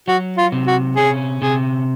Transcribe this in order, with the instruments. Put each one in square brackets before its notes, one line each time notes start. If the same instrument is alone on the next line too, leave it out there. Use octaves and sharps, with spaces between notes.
[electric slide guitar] F#3 [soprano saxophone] F#4
[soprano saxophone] F4
[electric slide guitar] C3
[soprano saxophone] F#4
[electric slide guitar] C#4 [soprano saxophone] G#4
[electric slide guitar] C3 [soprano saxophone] G#4